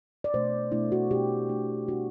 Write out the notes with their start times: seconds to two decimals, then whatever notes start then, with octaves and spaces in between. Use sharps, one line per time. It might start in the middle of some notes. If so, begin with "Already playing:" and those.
0.24 D5
0.34 B2 A3 D4 C5
0.72 B2 A3 D4 E4
0.92 F#4
1.11 B2 A3 D4 G4
1.49 B2 A3 D4
1.88 B2 G3 B3 D4 F#4